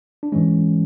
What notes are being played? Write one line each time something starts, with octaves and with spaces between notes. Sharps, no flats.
D4
G#2 E3 G#3 C#4